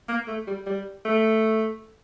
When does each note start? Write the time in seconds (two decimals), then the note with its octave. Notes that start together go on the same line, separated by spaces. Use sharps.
0.09 A#3
0.27 A3
0.47 G3
0.66 G3
1.05 A3